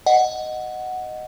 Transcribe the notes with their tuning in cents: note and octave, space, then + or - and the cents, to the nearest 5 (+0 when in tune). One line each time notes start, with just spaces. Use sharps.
D#5 +0 F#5 +0